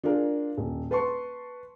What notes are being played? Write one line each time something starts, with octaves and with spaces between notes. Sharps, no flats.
D4 F4 G#4 A#4
D#1
B4 A5 C6 C#6